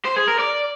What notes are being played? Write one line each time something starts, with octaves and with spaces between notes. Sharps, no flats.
C5
G#4
A#4
D5